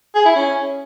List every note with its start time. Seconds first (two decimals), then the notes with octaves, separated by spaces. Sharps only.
0.15 G#4
0.25 E4
0.36 C#4